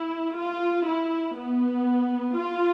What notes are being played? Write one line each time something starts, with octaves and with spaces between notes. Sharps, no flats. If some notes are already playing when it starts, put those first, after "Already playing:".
Already playing: E4
F4
E4
B3
F4